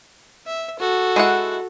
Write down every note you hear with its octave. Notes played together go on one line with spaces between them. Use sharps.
E5
F#4 A4
G#3 E4 F#5